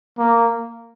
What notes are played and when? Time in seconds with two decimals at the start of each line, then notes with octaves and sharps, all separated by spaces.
0.18 A#3